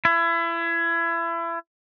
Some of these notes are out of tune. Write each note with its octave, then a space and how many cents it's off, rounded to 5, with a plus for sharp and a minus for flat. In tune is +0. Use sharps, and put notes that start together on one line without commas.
E4 +30